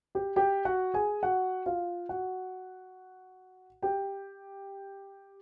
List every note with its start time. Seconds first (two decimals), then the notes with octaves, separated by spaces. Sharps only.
0.15 G4 G5
0.36 G4 G5
0.65 F#4 F#5
0.94 G#4 G#5
1.23 F#4 F#5
1.66 F4 F5
2.09 F#4 F#5
3.82 G4 G5